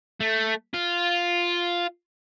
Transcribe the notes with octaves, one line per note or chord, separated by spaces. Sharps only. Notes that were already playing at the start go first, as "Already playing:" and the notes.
A3
F4